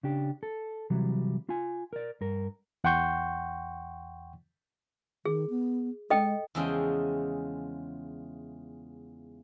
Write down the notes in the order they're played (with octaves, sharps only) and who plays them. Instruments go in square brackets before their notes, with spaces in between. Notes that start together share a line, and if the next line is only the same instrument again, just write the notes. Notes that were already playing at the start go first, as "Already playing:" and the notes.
[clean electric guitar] C#3 D4 G4
A4
C3 E3 F#3 G3
F4 G#5
A#4 D5
G2 A#4
[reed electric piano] E2 F#5 G5 C6 C#6 G6
[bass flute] D#3 [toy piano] G#4
[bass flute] B3
[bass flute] G#3 [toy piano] A4 D#5 G5
[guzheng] E2 C#3 F3 G#3 G#4 G5